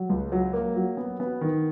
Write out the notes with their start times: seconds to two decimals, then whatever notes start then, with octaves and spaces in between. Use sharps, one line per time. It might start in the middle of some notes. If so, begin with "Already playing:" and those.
Already playing: F#3
0.09 C#2
0.32 F#3
0.53 A#3
0.75 F#3
0.97 B3
1.20 B3
1.41 D#3